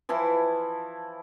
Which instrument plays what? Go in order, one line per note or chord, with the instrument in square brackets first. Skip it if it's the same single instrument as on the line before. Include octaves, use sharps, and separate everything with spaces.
[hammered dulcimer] E3 F3 E4 A5